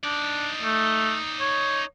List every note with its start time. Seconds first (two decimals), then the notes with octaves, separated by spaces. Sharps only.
0.04 D4 D#4 D5
0.63 A3
1.40 C#5